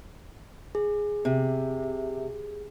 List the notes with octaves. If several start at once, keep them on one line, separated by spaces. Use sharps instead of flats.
G#4
C3